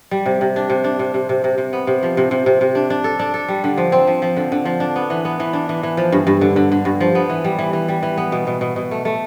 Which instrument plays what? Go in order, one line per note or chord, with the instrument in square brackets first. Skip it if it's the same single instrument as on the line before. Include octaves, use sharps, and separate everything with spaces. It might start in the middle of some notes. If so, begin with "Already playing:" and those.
[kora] G3
C3
C3
D4
C3
D4
C3
C3
C3
C3
C3
B3
C3
F3
C3
C3
C3
C3
D4
D4
A4
D4
A4
G3
D3
F3
C4
F3
F3
D3
D3
F3
D4
B3
E3
B3
E3
D4
E3
E3
F3
G2
G2
D3
D3
D3
G2
F3
B3
E3
G3
E3
E3
G3
E3
B3
B2
B2
B2
B2
A3
A3